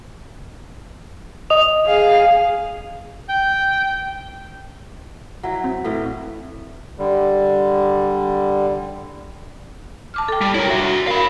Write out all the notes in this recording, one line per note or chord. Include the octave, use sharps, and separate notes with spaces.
D#5 D#6 F7
G#4 F5
G5
F#3 E4
C4
A2 E3 C#4
D3 G3
A5 D6 F6
A4 G5
G3
E4 A#4 C#5 A#5
F#4 E5
A#4 F5 B5